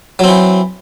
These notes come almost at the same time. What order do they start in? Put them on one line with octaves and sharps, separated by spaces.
F#3 C4 E3